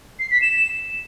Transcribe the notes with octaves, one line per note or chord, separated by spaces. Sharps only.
C7
B6
E7